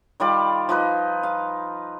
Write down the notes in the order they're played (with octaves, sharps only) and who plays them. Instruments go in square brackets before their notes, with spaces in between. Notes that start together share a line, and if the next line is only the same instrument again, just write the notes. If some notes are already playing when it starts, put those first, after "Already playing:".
[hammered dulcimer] D#3 G3 F4 D5
F3 D#4 B4
F5